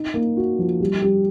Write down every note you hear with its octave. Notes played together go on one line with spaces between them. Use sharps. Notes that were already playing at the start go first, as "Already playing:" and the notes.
Already playing: D#4
A#3
F#4
F3
G3
G3